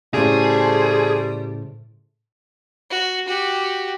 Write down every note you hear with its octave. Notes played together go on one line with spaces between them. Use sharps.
A2 C#3 G3 A3 G#4 C5
F#4
F#4 G4